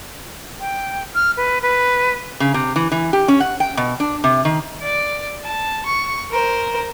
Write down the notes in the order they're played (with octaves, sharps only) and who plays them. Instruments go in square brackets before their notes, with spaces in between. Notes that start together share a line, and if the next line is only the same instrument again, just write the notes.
[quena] G5
F6
B4
B4
[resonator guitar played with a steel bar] C#3
C3
E3
E3
G4
C#4
F#5
G5
B2
D4
C3
D#3
[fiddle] D5
A5
C#6
A#4 C5